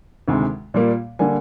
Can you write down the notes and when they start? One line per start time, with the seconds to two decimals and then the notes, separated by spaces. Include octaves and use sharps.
0.28 D2 C3 D#3 G#3
0.74 A#2 G3 A#3
1.19 D3 G3 A#3 G#5